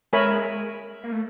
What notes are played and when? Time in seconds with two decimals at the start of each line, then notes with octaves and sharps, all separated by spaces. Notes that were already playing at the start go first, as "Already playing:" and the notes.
0.13 G#3 A#4 C#5 E5 G#5 B5
1.04 A#3
1.12 A3